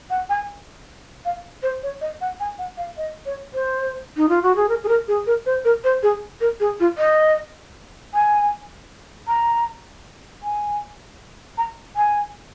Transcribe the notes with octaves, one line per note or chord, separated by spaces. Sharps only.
F#5
G#5
F5
C5
C#5
D#5
F#5
G#5
F#5
F5
D#5
C#5
C5
D#4
F4
F#4
G#4
A#4
G#4
A#4
G#4
A#4
C5
A#4
C5
G#4
A#4
G#4
F4
D#5
G#5
A#5
G#5
A#5
G#5